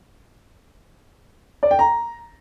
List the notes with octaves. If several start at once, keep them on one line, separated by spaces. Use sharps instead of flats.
D5
G5
A#5